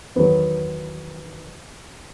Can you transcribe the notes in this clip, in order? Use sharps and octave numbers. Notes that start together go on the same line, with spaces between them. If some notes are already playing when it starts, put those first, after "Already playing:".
E2 D#3 F#3 B3